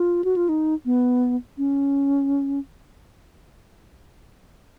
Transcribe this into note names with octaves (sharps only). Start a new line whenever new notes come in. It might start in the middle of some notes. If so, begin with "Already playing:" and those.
Already playing: F4
F#4
F4
D#4
B3
C#4